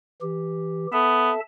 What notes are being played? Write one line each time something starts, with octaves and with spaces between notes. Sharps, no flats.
E3 G4
B3 A4 E5 A5